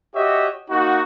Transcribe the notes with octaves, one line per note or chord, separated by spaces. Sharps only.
F#4 G4 C#5 D#5 E5
A#3 D#4 F#4